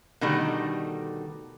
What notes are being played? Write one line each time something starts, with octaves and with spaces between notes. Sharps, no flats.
B2 D3 D#3 G3 A3